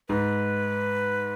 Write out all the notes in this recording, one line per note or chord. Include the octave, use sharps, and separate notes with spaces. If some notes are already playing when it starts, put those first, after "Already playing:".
G#2 B4